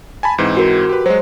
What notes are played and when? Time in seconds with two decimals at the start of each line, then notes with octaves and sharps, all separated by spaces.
0.23 G#5 A5 B5
0.38 G#2 E3 C4
0.57 F#4 A#4
0.89 G4 B4
1.06 F#3 G#3 C5